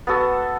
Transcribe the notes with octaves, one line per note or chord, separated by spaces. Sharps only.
B3 F#4 A4